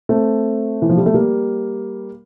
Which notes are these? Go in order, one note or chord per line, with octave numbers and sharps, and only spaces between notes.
A3 C4
E3
F3
G3
A3
G3 A#3